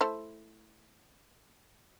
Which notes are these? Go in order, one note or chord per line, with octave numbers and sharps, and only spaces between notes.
A3 E4 C5